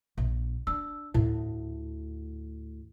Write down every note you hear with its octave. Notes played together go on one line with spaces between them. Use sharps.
A#1
D4 E6
D2 A2 E4